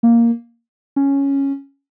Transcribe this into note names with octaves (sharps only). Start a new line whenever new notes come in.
A#3
C#4